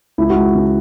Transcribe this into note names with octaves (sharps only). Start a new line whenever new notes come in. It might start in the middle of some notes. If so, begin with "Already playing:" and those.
C#2 E4
F#4
G#3
C#3